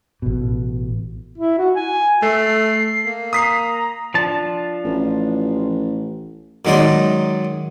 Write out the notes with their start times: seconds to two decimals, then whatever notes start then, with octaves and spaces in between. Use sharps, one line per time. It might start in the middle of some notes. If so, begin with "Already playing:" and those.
0.22 A1 B2
1.38 E4
1.58 F#4
1.76 G#5
2.22 A3 A4 C7
3.06 A#3
3.33 A#5 D#6 B6 C7
4.14 F3 D4 A5
4.85 A1
6.65 F#2 D#3 G#3 A#4 D5 C6